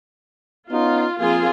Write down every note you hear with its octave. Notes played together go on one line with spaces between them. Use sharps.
B3 C#4 D#4 F4
F3 A#3 C4 F4 G#4